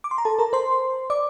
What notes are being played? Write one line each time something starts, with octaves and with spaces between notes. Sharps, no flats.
D6
C6
A#5
A4 A5
A#4 A#5
C5 C6
D5 D6